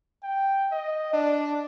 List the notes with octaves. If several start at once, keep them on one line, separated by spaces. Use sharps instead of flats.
G5
D#5
D4